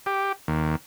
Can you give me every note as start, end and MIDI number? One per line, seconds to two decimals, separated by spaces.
0.06 0.32 67
0.48 0.76 39